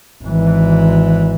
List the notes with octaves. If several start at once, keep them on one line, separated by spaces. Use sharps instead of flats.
G#1 E3